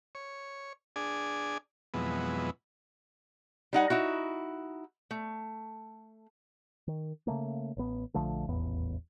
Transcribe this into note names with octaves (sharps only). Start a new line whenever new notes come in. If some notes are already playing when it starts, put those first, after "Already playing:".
C#5
D4 G#4 D5 G#5
F2 B2 E3 F#3 G#3 B3
G3 D#4 F#5 G#5
D#4 E4 F#4
A3
D#3
C#3 E3 A3 A#3
A1 B3
A#1 D3 F3 A3
D#1 A1 E2 B3